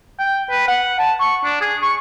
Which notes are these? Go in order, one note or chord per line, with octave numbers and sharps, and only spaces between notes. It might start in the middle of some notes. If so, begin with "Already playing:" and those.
G5
B4
F#5
A5
C#6
D4
G#4
C#6